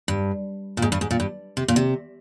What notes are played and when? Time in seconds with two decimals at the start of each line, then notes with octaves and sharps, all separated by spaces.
0.08 G2
0.77 A#2
0.82 G#2
0.92 G2
1.01 G#2
1.11 A#2
1.20 G2
1.57 C3
1.68 A#2
1.76 C3